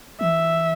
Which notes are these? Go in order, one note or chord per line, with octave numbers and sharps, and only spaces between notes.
E3 E5